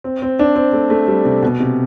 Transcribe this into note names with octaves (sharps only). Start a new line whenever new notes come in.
C4
C4
D4
C4
A3
A3
G3
C3
B2
C3